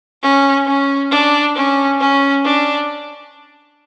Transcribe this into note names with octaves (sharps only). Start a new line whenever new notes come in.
C#4
C#4
D4
C#4
C#4
D4